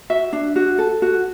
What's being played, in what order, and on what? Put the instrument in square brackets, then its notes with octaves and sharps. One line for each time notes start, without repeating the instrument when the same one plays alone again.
[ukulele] F#4 E5
D4
F#4
A4
F#4